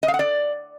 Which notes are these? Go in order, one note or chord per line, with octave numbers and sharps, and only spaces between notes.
D#5
F5
F#5
D5